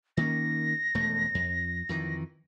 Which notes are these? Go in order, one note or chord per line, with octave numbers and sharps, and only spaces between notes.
D#3 A#3 C#4 A#6
E1 F2 A3
F2
F2 D#3 E3